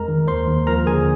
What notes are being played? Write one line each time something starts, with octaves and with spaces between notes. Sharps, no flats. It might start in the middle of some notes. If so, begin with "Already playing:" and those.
Already playing: F2 G#3 A#4 A#5
D#3
D#2 C5 C6
D#2
F3 A#4 A#5
D3 G#4 G#5